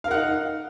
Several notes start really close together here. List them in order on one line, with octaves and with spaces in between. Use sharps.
F5 A#4 F#5 D#4